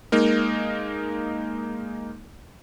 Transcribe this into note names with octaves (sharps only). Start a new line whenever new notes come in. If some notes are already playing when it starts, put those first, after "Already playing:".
G#3 A#3 D#4 A#4